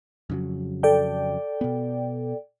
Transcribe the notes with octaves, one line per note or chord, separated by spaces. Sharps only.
F2 C#3 F#3
A4 D5 G5
B2 B3